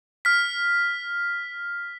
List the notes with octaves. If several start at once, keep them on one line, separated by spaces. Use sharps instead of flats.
F6 B6